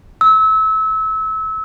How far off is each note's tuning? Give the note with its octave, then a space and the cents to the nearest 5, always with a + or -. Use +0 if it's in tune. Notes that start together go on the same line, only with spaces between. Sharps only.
E6 -30